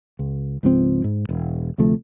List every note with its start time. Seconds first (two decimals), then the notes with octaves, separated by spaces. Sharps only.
0.19 C#2
0.63 C#2 G#2 F3 C4
1.04 G#2
1.29 E1
1.78 D2 C3 F3 A3